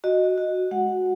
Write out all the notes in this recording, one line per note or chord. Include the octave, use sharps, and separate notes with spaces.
F#4 D#5
F#4
G#3 F#5